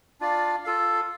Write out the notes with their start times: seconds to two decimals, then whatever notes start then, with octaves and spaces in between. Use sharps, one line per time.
0.20 D4 F4 D5 F5
0.64 F4 A4 F5